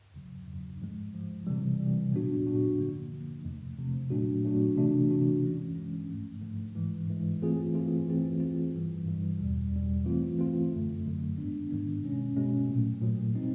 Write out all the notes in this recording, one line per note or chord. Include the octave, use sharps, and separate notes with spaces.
F2 C#3 F#3
F2 C#3 F#3
G#2 F3 G#3
G#2 F3 G#3
C3 E3 G3
C3 E3 G3
A#2 F#3 B3 D4 F#4
A#2 F#3 B3 D4 F#4
D3 F3 A#3
D3 F3 A#3
F2 C3 F3 A3
F2 C3 F3 A3
A#2 F#3 A3 D4 F#4
A#2 F#3 A3 D4 F#4
C3 E3 A3 D4 F#4
C3 E3 A3 D4 F#4
E3 G#3 C#4
E3 G#3 C#4
G#2 F3 A3
G#2 F3 A3
G#2 E3 G#3
G#2 E3 G#3
E3 A3 C4 F4 G#4
E3 A3 C4 F4 G#4
E3 A3 C4 F4 G#4
E3 A3 C4 F4 G#4
G2 E3 G3
G2 E3 G3
E2 B2 G3
E2 B2 G3
E3 A3 C4 F4
E3 A3 C4 F4
F#2 D3 F#3 A3
F#2 D3 F#3 A3
G#2 D#3 G#3 B3 D4
G#2 D#3 G#3 B3 D4
B2 G#3 C#4
B2 G#3 C#4
A#2 F#3 A3
A#2 F#3 A3
B2 G3 C4 D#4